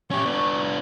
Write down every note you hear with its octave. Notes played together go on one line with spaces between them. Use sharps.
C#4 G4 C#6
B3 D4